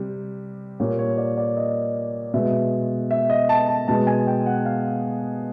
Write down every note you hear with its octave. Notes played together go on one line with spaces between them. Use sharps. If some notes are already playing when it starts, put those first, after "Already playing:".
Already playing: C3 G3
A#2 G3 A#3 C#5
C#5
D5
D5
D#5
B2 G#3 E5
E5
D#5
A5
A5
B2 G#3 A5
G#5
G5
F#5
F5